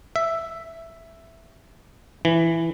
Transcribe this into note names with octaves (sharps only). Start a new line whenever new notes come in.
E5
E3